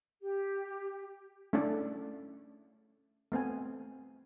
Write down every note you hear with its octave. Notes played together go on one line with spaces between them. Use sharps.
G4
A3 C#4 D4 E4 A4 D5
A3 B3 C4 G#5